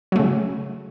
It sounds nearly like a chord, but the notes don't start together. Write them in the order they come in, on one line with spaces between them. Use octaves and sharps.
F#3 A3 C#3